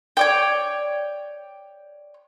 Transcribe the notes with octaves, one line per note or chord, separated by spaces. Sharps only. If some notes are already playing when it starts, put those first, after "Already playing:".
C#5 D5 G5